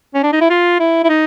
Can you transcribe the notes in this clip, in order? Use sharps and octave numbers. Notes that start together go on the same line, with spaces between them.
C#4
D4
D#4
E4
F4
E4
E4
D#4